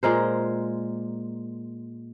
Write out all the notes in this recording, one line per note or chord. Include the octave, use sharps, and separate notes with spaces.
A#2 G#3 A#4 C5